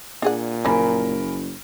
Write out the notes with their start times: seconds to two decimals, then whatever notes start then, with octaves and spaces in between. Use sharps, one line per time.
0.22 A#2 D4 G#4 F#5
0.65 F#1 F3 A#3 A#4 G#5 B5